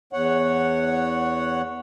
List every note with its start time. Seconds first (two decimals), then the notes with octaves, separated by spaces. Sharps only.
0.13 E2 C#5 F#5